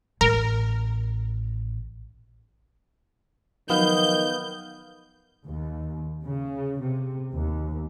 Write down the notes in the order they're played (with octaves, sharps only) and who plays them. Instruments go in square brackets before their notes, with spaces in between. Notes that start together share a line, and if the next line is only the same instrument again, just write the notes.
[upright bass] A1 [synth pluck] A#4
[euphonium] D#3 [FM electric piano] F3 F#3 D#4 [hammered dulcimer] B3 F5 [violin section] G6
[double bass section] D#2
C#3
C3
D#2